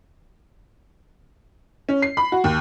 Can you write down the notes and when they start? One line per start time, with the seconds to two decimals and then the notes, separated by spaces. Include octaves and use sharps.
1.89 C#4
2.02 C7
2.17 B5
2.32 F#4
2.44 D#2